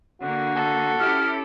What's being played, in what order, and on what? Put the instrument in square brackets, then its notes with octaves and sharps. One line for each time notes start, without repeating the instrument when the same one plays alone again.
[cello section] D3 A#3 [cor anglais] F#4
[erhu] A4
[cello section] C#4 E4 G4 [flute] F6